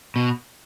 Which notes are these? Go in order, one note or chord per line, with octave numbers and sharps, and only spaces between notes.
B2